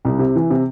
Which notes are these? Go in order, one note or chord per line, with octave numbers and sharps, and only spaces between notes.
C2
C3
E3
C3